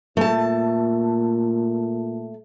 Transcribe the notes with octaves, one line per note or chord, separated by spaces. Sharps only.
A#2 A3 A5